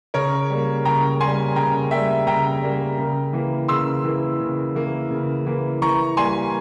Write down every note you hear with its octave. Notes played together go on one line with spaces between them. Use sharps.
C#3 A#4 C#5
G3 A#3
C#3 G5 A#5
G3 A#3 G#5 C6
C#3 G5 A#5
G3 A#3 E5 G5
C#3 G5 A#5
G3 A#3
C#3
E3 A#3
C#3 C6 E6
E3 A#3
C#3
E3 A#3
C#3
E3 A#3
E3 A#5 C#6
G3 A#3 G#5 C6